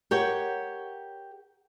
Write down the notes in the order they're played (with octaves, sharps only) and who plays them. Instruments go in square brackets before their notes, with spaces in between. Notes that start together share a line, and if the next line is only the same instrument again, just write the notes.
[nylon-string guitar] G4 A#4 C#5 F#5 G5